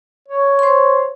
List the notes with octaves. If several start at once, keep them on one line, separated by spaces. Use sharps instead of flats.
C#5
C5 C6